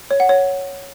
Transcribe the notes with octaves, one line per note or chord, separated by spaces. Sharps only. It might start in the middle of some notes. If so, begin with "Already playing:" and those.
C#5
F#5
C#5